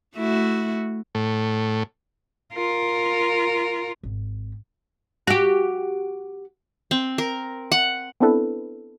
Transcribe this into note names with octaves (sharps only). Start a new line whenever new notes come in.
A3 E4 F#4
A2
F4 A#4
G#1
F#4 G4
C4
A#4
F#5
B3 C4 D4 E4 A4 B4